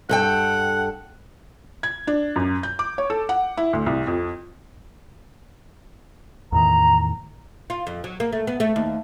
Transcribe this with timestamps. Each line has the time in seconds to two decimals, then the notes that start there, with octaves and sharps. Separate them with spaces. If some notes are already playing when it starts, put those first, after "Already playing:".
0.09 G2 A4 F#5 G5
1.83 G#6
2.07 D4
2.36 F#2
2.63 G6
2.79 D6
2.98 C#5
3.10 A4
3.29 F#5
3.57 E4
3.73 D2
3.86 C2
4.07 F2
6.52 E2 A2 D#3 A#5
7.70 F4
7.87 F2
8.04 F#3
8.20 A#3
8.32 A3
8.47 B3
8.60 A3
8.76 D#2